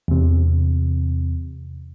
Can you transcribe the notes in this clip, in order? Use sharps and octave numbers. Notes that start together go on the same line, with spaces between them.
E2 C3